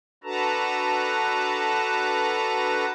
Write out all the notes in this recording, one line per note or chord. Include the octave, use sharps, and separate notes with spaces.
D4 F#4 A4 B4 A5 A#5